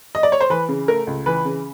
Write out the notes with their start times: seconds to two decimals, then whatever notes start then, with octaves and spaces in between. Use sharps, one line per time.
0.15 D#5
0.23 D5
0.32 C#5
0.41 C5
0.50 E3 B4
0.69 C#3
0.88 A3 A#4
1.07 C#2
1.26 E3 B4
1.45 C#3